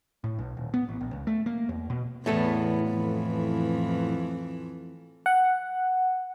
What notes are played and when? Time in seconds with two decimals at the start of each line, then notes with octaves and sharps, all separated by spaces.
0.24 A2
0.39 B1
0.57 D#1
0.74 B3
0.89 A1
1.01 A#1
1.13 C#2
1.27 A3
1.46 A#3
1.69 E2
1.90 B2
2.26 E2 A2 A3 B3
2.92 F2 E3
5.26 F#5